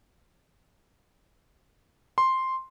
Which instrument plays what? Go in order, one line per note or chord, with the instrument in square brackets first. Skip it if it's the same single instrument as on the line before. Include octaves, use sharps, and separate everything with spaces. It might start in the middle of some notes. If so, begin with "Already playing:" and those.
[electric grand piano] C6